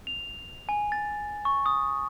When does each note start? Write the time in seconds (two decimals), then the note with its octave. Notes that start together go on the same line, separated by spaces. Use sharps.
0.07 F7
0.69 G#5
0.92 A6
1.45 C#6
1.66 D#6